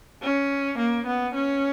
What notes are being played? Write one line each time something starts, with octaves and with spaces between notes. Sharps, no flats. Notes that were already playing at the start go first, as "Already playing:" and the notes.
C#4
A#3
B3
C#4